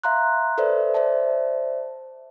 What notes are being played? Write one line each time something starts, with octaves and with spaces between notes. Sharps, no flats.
E5 F5 A#5 C6 F#6
A4 B4 C5 D5 E5
C5 D5 E5 A5